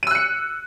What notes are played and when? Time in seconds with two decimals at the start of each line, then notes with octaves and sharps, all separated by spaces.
0.03 D#7
0.07 E6
0.11 F#6
0.15 C#7